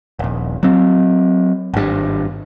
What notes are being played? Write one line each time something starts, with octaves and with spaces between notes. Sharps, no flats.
D#1 A#1
F#3 C4
G#1 G2